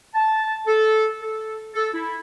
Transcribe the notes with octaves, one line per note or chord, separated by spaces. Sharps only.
A5
A4
A4
A4
E4